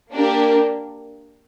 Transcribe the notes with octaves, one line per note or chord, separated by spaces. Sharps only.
A#3 D4 G4 A#4